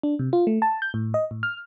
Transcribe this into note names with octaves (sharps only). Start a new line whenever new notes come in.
D4
C3
F4
A3
A5
G6
A2
D#5
A2
F6